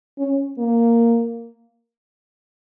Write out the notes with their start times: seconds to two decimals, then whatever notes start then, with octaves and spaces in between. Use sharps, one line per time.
0.19 C#4
0.58 A#3